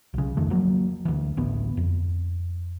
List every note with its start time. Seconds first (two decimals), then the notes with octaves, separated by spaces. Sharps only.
0.14 B1 C#3
0.37 F2 D#3 A3
0.50 F3 F#3 A#3
1.05 D2 E3
1.37 A1 D2 B3
1.77 F2